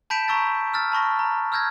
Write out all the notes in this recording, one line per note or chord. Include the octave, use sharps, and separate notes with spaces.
A5 B5 G6 B6 D7 E7
A#5 C#6 E6 G6 A6
E6 F6 A6
A5 B5 C#6 A#6
A#5
E6 F6 G6 G#6 A#6